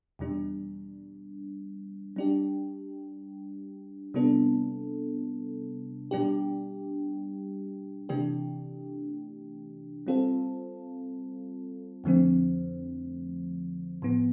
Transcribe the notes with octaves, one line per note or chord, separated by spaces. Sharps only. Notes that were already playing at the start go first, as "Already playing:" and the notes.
E2 B2 G3 D4
G3 D4 G4
C3 G3 B3 D4 A4
B2 G3 D4 G4
C3 E3 A3 D4 G4
G3 C4 F4 A4
F2 D3 F3 A3 C4
A2 F3 B3